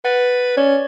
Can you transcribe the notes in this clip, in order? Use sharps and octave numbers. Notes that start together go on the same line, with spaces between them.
B4 F#5 A6
C#4 C#5 D5